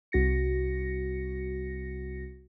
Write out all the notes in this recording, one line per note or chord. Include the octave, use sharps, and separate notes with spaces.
C2 F#4 A#6 C#7